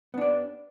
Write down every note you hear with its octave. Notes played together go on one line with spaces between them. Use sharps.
B3 D4 D5